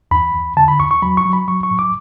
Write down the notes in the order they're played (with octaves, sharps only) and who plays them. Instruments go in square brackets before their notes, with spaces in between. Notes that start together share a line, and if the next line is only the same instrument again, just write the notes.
[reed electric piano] E2 B5
E2
D3 A5
B5
E2 C#6
C#6
F#3 B5
C#6
F#3
B5
F#3 C#6
C#6
A2
D6